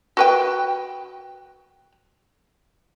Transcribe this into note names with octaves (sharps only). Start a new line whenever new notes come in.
F#4 B4 G5